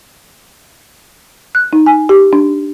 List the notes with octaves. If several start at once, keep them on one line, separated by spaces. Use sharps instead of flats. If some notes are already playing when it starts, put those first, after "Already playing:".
F#6
D#4
G#5
G4
D4